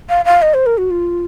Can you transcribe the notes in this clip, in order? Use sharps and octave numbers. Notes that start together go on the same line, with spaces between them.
F5
F5
D#5
C5
A#4
F#4
F4